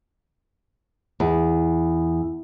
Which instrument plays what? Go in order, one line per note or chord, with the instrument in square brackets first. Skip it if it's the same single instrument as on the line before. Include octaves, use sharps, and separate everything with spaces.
[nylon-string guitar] E2